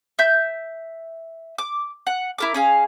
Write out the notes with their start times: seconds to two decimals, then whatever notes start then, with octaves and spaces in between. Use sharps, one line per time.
0.19 E5 G6
1.58 D6
2.07 F#5
2.38 E4 A#4 D6
2.54 C#4 G#4 F5